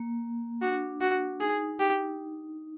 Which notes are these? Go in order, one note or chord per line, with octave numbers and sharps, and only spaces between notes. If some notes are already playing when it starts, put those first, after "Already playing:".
Already playing: A#3
D4 F#4
F#4
D#4 G#4
G4